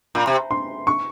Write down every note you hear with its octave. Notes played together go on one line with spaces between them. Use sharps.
A#2 B5
C3
C6
C#6